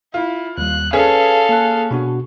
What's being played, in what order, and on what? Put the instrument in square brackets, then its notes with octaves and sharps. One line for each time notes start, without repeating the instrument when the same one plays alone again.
[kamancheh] E4 [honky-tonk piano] F4
[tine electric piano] D#2 G3 [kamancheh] F#6
[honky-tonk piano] C#4 G#4 [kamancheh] A4 F5 [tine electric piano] B4
[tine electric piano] A#3 A5 F#6
B2 D4 F#4